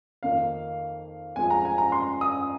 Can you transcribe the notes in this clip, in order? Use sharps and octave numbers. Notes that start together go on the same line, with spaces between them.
F2 D#3 A#3 D#4 F5
F2 F3 G#3 C4 G#5
A#5
G#5
A#5
C6
D#6